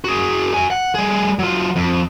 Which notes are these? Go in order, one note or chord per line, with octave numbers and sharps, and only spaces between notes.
F#4 G#4
F#4 G#5
F#5
G3 G#4
F#3 F4
F2